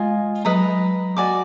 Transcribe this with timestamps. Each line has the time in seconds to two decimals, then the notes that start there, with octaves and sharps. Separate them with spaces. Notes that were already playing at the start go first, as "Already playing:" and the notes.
Already playing: G#3 F4 D#5 G#5
0.45 F#3 B4 D#5 A#5 D#6
1.17 F#4 D5 G#5 D6